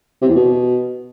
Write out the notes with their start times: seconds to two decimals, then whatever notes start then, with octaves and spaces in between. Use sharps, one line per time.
0.21 C3
0.28 E2
0.35 B2